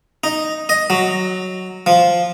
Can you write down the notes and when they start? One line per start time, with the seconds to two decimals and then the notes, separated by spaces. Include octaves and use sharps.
0.24 D#4
0.69 D#5
0.90 F#3
1.86 F3